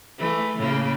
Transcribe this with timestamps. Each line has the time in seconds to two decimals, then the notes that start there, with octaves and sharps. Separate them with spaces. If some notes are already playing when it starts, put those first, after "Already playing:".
0.18 E3 A3
0.58 A2 C#3 A#3